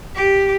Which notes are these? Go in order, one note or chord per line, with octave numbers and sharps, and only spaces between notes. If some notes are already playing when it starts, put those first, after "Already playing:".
G4